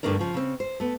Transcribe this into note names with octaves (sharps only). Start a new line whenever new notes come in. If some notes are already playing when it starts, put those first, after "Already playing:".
G2 D3 A3 D4 A#4 D5
C#3 F3
C#3 C4
C5
A3 B3